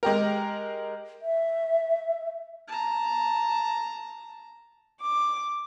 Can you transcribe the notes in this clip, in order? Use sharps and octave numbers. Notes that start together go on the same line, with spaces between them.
G#3 G4 A#4
E5
A5 A#5
D6